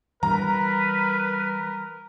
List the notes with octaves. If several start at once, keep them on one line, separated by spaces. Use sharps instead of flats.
E3 G3 A#4 B4 A#5